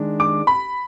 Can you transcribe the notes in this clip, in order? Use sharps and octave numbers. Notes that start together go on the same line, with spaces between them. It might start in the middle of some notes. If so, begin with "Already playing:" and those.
Already playing: D#3 G#3 D4
D6
B5